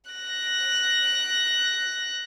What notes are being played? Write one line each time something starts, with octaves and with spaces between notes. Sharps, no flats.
F#6 A#6